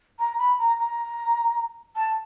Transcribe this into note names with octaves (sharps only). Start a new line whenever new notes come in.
A#5
B5
A#5
A#5
A5